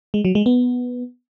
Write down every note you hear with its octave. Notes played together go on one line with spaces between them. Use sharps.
G#3
F#3
G#3
B3